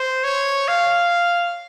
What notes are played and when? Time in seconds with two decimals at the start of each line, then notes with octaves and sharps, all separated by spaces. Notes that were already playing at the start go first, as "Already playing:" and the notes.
Already playing: C5
0.24 C#5
0.68 F5